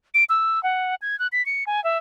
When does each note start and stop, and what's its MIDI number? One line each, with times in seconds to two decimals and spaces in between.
0.14 0.24 98
0.29 0.62 88
0.63 0.95 78
1.02 1.18 92
1.19 1.27 90
1.32 1.45 95
1.46 1.64 97
1.67 1.83 80
1.84 1.98 76